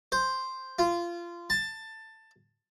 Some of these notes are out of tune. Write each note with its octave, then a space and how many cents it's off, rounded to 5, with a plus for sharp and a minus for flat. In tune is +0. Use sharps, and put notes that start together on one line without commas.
C5 +0
F4 -20
A5 +15